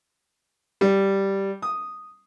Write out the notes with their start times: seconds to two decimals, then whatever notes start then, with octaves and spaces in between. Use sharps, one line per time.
0.81 G3
1.62 D#6